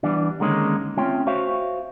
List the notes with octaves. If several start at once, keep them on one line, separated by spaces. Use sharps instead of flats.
E3 G3 B3 D4
D3 D#3 G#3 A#3 C#4 D#4
A3 C4 C#4 F4 G5
F#4 C5 C#5 E5 F5